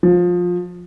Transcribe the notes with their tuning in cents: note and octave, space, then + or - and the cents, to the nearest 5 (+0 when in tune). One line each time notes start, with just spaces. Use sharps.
F3 +20